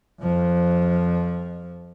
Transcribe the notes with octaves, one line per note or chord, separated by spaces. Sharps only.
F2 F3